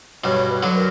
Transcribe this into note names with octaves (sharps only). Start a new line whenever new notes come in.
G2 B2 C#5
B4
D3 F#3
A#4